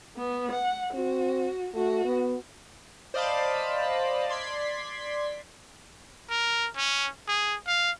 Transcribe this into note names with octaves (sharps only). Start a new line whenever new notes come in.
B3
F#5
C4 F#4
A3 F#4
B3
C5 D5 D#5 F5 A5 B5
D5 C6 G#6 B6
A#4
C#4
G#4
F5